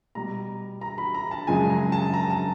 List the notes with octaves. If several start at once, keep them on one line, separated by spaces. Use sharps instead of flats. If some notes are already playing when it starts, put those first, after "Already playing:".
B2 G3 A#5
A#5
B5
A#5
A5
F#2 C#3 F3 G#3 G#5
A#5
A5
A#5
A5